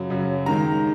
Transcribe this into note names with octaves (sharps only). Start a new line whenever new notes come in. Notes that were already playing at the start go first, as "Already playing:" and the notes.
Already playing: F#2 C#3 F#3
F#2 C#3 F#3
D#2 D#3 G#3 A#5